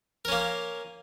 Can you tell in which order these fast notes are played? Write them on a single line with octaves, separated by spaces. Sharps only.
A#4 C#4 A#3